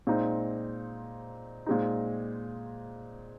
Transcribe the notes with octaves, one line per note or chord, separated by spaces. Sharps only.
A#2 G#3 C4 D#4
A#2 G#3 C4 D#4